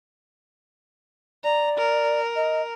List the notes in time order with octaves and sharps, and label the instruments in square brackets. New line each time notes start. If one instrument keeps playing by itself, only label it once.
[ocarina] D5 [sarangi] A#5
[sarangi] A#4
[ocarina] D#5